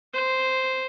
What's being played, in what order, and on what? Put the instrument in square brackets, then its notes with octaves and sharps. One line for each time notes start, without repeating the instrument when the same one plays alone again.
[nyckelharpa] C5